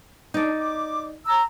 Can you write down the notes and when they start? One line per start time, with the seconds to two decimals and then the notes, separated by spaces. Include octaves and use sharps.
0.34 D4 D#4 D5
0.59 D6
1.26 A#5 E6